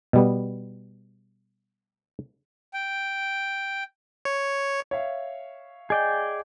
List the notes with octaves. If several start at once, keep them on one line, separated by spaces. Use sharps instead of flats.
B2 G3 B3
G5
C#5
C#5 E5 F5
G#4 D5 D#5 G5 G#5 G6